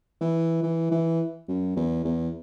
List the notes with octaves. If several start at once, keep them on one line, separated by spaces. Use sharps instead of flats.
E3
E3
E3
F#2
E2
E2